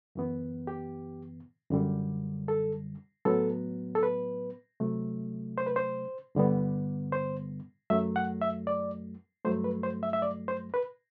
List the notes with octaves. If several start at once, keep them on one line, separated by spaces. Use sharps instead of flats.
F#2 E3 B3
G4
F#2 D3 G3
A4
A2 F#3 B3 A4
A4
B4
C3 F#3 A3
C5
B4
C5
G2 D3 G3 B3
C5
F#2 F#3 A3 E5
F#5
E5
D5
G2 F#3 A3 C5
B4
C5
E5
E5
D5
C5
B4